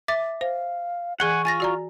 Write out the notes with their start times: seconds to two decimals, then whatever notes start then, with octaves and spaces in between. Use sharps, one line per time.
0.08 E5 D6 A6
0.41 C5 F5
1.20 E3 G#4 F#5 G#5 C#6 G#6
1.45 F4 G#5 A6 A#6
1.60 F#4 D5 A#5